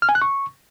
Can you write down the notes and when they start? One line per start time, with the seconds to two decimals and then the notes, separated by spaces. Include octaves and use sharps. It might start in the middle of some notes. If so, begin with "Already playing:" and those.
0.02 F6
0.09 G#5
0.15 F#6
0.22 C#6